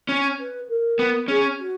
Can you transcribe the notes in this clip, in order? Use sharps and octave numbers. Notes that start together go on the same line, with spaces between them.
C#4
B4
A#4
B3
C#4 G#4
F#4